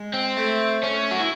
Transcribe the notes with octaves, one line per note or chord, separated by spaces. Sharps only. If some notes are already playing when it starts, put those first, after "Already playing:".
Already playing: G#3
C4
A3
A3 C#4
F#4
E4